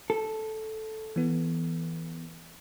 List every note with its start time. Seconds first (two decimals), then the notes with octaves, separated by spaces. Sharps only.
0.10 A4
1.16 E3 B3